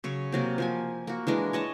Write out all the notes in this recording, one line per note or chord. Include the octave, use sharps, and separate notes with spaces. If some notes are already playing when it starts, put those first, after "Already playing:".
C#3 F#3 C#5
C3 F#3 A#3
F3 A#3 G#5
A#3 F#4
E3 G#3 D4 A#4
C#5 D#5 A5